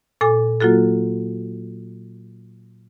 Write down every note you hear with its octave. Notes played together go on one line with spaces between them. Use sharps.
A#2 A4 G#5 D6
F#3 A#3 F4 F#4 A4